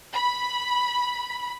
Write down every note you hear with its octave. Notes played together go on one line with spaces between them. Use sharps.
B5